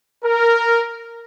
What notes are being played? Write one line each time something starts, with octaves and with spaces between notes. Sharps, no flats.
A#4